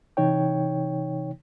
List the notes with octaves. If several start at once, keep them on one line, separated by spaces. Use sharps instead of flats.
C3 E3 D#4 C#5 G5